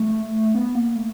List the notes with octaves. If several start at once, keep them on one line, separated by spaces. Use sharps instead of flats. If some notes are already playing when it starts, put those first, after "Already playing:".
Already playing: A3
B3
A#3
A3